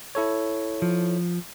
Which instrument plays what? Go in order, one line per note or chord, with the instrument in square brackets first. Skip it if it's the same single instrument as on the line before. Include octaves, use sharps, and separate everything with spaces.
[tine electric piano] E4 A4 C#5
[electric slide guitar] F3